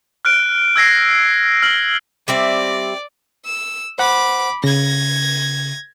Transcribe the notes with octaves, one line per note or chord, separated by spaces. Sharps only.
F6 F#6 D7
E6 G#6 A#6 C7
F6 F#7
G3 C4 D5 E5
E6
C5 F#5 B5 D6
C#3 G#6 A#6